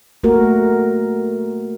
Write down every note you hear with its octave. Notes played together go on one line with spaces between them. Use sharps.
A3 A#3 F#4 A#4